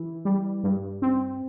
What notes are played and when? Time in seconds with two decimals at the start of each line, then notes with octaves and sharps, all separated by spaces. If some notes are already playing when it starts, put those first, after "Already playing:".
Already playing: E3
0.25 G3
0.64 G2
1.02 C4